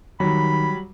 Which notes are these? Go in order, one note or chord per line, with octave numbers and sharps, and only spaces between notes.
D#3 F#3 G3 B5